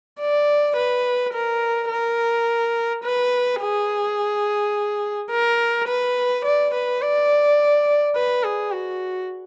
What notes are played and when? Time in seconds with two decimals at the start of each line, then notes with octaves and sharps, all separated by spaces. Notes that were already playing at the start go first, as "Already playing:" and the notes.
0.20 D5
0.76 B4
1.34 A#4
1.90 A#4
3.04 B4
3.61 G#4
5.31 A#4
5.88 B4
6.44 D5
6.74 B4
7.02 D5
8.16 B4
8.44 G#4
8.73 F#4